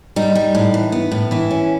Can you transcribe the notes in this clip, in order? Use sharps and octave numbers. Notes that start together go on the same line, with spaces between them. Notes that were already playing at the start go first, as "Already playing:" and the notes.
G3 D#4
G3
A2
E3
B3
A2
E3 E4
C#4